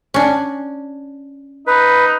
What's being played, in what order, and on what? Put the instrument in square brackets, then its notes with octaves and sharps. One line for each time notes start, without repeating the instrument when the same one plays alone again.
[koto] C#4 D4
[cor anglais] D#4 [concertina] B4